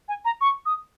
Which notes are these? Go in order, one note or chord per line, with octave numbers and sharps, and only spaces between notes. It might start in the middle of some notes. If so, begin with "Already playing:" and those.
G#5
A#5
C#6
D#6